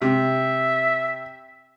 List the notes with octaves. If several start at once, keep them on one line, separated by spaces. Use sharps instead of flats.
C3 E5